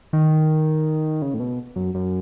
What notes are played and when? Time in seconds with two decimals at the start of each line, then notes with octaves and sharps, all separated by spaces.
0.13 D#3
1.22 C#3
1.34 A2
1.40 B2
1.76 F#2
1.95 F#2